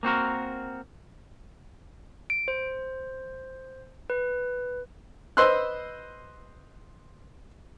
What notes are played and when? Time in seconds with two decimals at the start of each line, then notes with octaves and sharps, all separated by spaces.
0.03 A#3 C4 F#4 A#4
2.30 D7
2.48 C5
4.10 B4
5.37 B4 C5 D#5 C6 E6 F#6